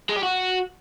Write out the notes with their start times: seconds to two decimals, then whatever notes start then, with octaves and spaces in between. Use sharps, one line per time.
0.09 G#3
0.16 G4
0.23 F#4